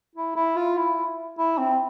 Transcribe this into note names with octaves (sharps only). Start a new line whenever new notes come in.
E4
E4
F4
E4
E4
C4